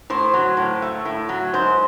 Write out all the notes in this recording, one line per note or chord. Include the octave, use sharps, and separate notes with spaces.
A2 C5
F#3
A2
A3
A2
F#3
G#2 C5